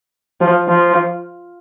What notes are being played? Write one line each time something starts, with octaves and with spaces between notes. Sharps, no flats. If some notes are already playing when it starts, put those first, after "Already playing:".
F3
F3